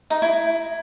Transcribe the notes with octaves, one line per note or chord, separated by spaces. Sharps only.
D#4
E4